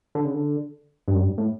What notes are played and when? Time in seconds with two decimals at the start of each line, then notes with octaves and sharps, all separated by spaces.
0.15 D3
0.25 C#3
0.34 D3
1.08 G2
1.14 F#2
1.22 G2
1.38 A2